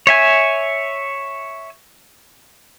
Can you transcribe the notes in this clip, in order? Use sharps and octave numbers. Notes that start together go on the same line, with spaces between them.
C#5 E5 G#5